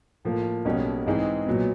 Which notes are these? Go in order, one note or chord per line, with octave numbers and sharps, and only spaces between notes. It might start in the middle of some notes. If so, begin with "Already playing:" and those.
A2 F3 A#3
B1 B2 G3 A#3 C#4
G#2 E3 G#3 C4 D#4
A#2 F#3 B3